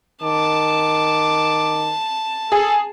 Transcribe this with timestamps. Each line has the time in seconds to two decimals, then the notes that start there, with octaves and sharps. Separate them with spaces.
0.23 D#3 A5 D6
2.52 G#4 A4